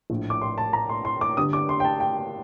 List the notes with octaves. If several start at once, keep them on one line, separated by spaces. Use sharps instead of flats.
A#1 A2
D6
C6
A5
A#5
C6
C6
D6
G1 G2 D3 D#6
D6
C6
G5
A5
G5